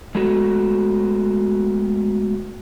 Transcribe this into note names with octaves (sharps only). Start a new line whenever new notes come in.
G#3 A3 B3 F#4